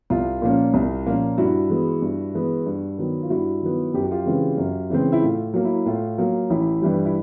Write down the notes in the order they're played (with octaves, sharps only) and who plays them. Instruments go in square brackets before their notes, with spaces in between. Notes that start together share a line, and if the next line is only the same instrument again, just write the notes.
[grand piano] C2 F4
A#2 F3 A#3 C#4
C2
A#2 F3 A#3 C#4
G2 E4 F#4
E3 G#3 B3
G2
E3 G#3 B3
G2
D#3 F#3 B3
F4
G2 E4 F#4
D#3 F#3 B3
F#2 G4
F#4
F4 G4
C#3 E3 G#3 C4
F#2
C#3 E3 G#3 C4
E4
A2 F4
F#3 A#3
E4
A2 F4
F#3 A#3
A1 E4
G2 E3 G3
E4